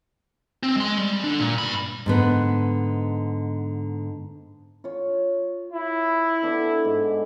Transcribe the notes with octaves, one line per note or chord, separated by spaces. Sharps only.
C4
G#3 C6
G3
D3 D4
A#2
G2 B5
G#2 D3 B3
F4 C#5
E4
B3 D4 A4
G#2 D#5